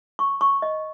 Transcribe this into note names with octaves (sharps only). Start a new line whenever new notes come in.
C#6
C#6
D#5